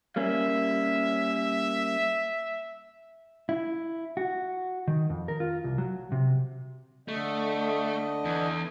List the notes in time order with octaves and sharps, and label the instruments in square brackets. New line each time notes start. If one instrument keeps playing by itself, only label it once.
[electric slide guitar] G3 A#3 C#4 [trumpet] E5
[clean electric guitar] E4
F#4
D#3
F2
A#4
F4
C2
F#3
C3
[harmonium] D3 D#5 [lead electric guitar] A3
[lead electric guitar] E2